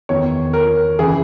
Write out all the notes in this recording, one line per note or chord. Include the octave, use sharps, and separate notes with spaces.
E2 D#3 C#5
A#4
C#3 E3 G#4